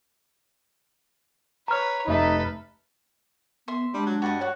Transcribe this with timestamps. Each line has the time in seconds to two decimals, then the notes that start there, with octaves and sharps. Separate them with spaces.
1.68 B4 C#5 A#5 F6
2.07 F1 D#4 A4 B4 E5 B6
3.68 B3 E5 C6
3.94 G3 G#3 D4
4.06 F#3
4.22 G2 F#4 D#5
4.41 F#4 C#5 F#5